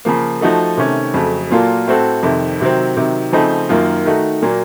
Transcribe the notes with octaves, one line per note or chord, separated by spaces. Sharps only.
C#3 F3 A#3
F3 A3 D#4 F#4 A4
C3 D#3 A3 C#4
F2 C#3 F#3 A3
A#2 F#3 A#3 F4 A4
A2 A3 C4 F#4 A4
F2 C3 D#3
C3 D#3 F#3 C4
C3 D#3 F#3
C#3 F3 A3 C4 D#4
F#2 D#3 A#3 F4
D#3 A3 D#4 F#4
A#2 F#3 A#3